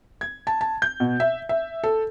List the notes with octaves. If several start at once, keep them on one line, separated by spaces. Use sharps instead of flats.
G#6
A5
A5
G6
B2
E5
E5
A4